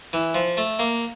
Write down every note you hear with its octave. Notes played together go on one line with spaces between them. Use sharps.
E3
F3
A3
A#3